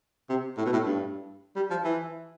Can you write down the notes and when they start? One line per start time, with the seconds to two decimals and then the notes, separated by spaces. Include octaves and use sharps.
0.29 C3
0.58 A2
0.65 B2
0.73 A2
0.86 G2
1.56 G3
1.70 F3
1.84 E3